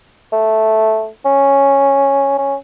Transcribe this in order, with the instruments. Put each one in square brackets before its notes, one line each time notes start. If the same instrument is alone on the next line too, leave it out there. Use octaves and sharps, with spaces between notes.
[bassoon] A3
C#4
C#4